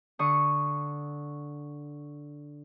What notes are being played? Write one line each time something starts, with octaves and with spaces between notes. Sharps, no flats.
D3 C#6 D#6